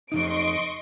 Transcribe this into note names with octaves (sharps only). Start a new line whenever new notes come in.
F2 C#3 D#4 D#5 C6 C#6 D7